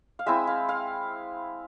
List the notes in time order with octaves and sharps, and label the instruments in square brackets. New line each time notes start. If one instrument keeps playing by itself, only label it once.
[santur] F5
G#3 C4 E4 E5
F5
F5